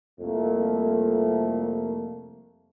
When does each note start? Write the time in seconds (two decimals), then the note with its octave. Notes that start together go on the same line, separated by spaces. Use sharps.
0.20 C2 F2 A3 A#3